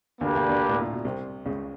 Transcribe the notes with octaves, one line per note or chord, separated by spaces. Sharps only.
D2 D3 A#3 D4 G4 B4
D2 D3
D2 D3
A2
A#2
B2
C2 C3
C#2 C#3